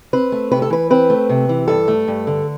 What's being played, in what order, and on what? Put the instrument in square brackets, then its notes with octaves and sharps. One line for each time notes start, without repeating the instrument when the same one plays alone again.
[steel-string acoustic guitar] C4 B4
A3
C3 B4
A4
E3 B4
C4 B4
A3
C3
E3
G2 A4
A3
G2
D3